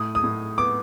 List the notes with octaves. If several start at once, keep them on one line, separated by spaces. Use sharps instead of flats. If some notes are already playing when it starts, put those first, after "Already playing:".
Already playing: A2 D#6
D#6
A2
B3 D6